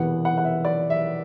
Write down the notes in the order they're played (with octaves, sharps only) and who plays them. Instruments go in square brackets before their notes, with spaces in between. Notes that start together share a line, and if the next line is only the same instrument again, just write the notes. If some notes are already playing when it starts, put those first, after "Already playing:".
Already playing: [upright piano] E1 E2 C3 E3 B3 F#5
F#5
F#5
E5
D5
E5